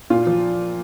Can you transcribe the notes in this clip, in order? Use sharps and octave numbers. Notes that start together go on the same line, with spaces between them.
A#2 F4
F3